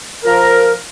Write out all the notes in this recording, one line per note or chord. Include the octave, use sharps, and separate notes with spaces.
F3 A#4